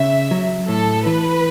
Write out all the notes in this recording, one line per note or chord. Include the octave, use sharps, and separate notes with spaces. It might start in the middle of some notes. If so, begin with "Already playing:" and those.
Already playing: C#3 E5
F#3
A2 A4
E3 B4